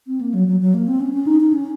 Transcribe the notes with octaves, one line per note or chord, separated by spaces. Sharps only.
C4
A#3
F#3
F#3
F#3
A#3
C4
C#4
C#4
D#4
D#4
C#4